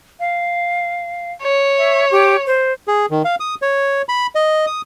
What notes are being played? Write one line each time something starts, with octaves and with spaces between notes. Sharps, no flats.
F5
C#5
E5
G4
C5
G#4
D#3
F5
D#6
C#5
B5
D#5
D#6